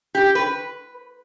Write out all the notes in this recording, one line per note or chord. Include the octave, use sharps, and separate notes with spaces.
G4
B4